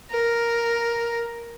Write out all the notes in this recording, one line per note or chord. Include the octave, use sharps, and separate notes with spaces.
A#4